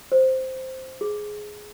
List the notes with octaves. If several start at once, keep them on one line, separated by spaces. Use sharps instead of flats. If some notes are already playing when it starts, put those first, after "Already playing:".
C5
G#4